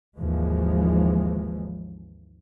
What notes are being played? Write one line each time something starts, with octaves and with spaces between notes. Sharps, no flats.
G#1 D#2 E3 F3 G#3